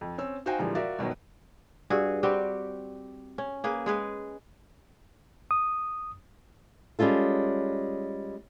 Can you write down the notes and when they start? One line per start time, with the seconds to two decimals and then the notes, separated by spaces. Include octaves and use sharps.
0.01 F2
0.18 C4 C#4 E6
0.46 D#4 F#4 C5 F5 G5 G#5
0.59 A#2 D3 E3 F3 G3 G#3
0.75 F4 F#4 A#4 D5 E5
0.99 G1 B2 D#3 F#3
1.90 G2 F#4 G#4
2.23 G3 C4 F#4 G4
3.38 C#4
3.64 A#3 G#4 B4
3.86 G#3 G#4 B4
5.51 D#6
6.99 G3 G#3 C#4 F4 A4